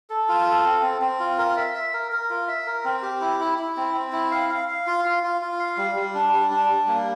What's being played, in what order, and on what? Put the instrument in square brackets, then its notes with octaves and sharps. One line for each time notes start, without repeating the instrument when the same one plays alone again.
[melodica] A4
F4
A4
C4
C4
C4
F4
A#4
E5
E5
A#4
A#4
F4
E5
A#4
C4
G4
E4
E4
E4
C4
C4
E4
F5
F5
F5
F4
F4
F4
F4
F5
G3
G3
D4
G3
D4
G3
A#3